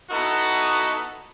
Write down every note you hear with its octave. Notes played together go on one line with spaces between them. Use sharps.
B3 D#4 E4 F#4 A4